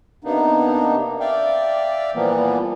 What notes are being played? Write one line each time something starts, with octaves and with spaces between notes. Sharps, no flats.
C3 A#3 B3 D4 D#4
D5 E5 F5 G5
A#2 E3 F3 G3 A#3 B3